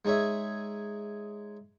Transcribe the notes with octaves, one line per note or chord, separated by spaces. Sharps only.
G#3 D#4 G#4 C#5 E5